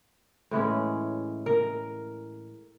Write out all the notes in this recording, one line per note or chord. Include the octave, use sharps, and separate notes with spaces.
A2 E3 G#3 C#4
A#4